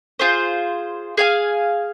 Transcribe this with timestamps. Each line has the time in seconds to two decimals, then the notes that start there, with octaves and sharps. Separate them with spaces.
0.19 F4 G#4 C5
1.17 G#4 F5 G#5